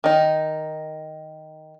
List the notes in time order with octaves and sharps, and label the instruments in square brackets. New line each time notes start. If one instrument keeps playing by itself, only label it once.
[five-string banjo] D#3 D#4